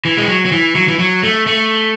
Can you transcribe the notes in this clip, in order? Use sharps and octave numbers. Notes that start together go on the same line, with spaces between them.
E3
G#3
F#3
F#3
E3
F#3
E3
F#3
A3
A3